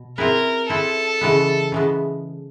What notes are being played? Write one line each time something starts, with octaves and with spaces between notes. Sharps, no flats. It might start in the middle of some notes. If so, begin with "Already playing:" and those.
Already playing: B2
C4 E4 G#4 A#4 B4
C4 E4 G#4 A4 B4
C#3 E3 G#3 B3
C#3 E3 G#3 B3